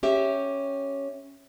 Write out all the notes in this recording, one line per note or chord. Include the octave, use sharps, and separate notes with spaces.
C#4 G4 E5